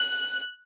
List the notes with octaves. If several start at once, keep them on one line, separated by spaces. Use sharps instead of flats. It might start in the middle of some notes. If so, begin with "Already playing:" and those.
Already playing: F#6